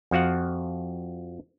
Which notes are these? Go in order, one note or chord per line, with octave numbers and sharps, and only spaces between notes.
F2 F3 F#4 F5 F#5